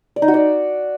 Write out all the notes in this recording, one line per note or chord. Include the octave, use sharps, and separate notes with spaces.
D5
D#4
F#4
D5